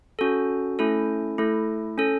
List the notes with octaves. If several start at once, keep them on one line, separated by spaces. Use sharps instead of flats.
C#4 F#4 A4
A3 C#4 E4 A4
A3 E4 A4
C#4 A4